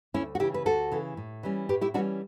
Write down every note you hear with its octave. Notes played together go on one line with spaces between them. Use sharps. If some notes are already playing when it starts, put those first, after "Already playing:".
D2 C#4 E4
F#4
C#3 E3 E4 G4
B4
D2 F#4 A4
C#3 E3
A2
E3 G3 C#4
A2 G4 B4
E4 G4
E3 G3 C#4 D4 F#4